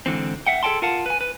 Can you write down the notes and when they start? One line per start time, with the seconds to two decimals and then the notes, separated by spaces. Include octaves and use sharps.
0.06 G#2 D3 E3 C4
0.46 E5 F#5 G5
0.63 G#4 A4 D5 G5 A5 C6
0.82 F4 A#4 F5 F#5 A5
1.06 B4 G#5
1.21 B4